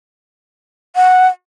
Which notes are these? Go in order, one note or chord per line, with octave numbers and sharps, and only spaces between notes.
F#5